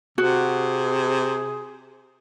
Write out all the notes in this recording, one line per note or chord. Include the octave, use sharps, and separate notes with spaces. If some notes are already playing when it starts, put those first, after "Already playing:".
C3 F#4 G#4